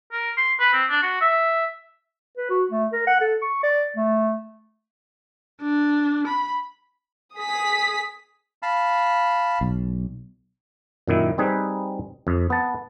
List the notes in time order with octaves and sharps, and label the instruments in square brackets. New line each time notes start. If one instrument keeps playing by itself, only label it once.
[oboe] A#4
C6
B4
C4
D4
F#4
E5
[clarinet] B4
F#4
A3
A#4
F#5
A4
C#6
D5
A3
[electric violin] D4
B5
[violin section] G#4 D#6 B6
[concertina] F5 A5 B5
[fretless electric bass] B1
[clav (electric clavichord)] F#2 A#2 D#3 E4
G3 C4 D#4 G#4 B4
F2
B3 A5